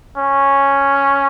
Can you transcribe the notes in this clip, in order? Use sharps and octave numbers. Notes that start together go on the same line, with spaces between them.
C#4